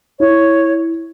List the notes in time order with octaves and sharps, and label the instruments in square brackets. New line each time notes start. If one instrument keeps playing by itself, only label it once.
[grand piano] E4 [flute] C#5